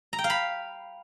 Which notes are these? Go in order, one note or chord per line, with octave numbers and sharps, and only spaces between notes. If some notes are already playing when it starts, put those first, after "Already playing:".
A#5
G5
F5
B5